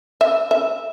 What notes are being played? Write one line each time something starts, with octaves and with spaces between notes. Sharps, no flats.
E5
E5